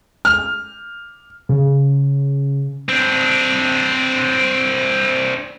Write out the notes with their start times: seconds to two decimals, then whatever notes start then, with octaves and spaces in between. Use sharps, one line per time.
0.25 F6
1.49 C#3
2.89 C4 D4